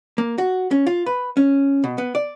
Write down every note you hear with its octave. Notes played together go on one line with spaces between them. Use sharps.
A#3
F#4
C#4
F4
B4
C#4
B2
B3
D5